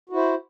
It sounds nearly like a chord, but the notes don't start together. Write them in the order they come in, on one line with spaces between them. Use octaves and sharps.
F#4 E4 C5